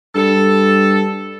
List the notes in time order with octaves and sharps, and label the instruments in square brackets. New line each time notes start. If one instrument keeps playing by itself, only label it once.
[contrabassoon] G2 [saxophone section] A4